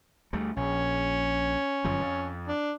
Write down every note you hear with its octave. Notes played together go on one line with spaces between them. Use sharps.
D2 G3 A3
A#1 C#4
G1 F#2 F3
F2
D4